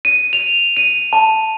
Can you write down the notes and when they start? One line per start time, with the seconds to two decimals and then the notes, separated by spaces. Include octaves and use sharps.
0.05 D#7
0.33 F7
0.77 D#7
1.13 A5